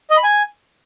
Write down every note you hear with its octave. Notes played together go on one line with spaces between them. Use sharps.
D#5
B5
G#5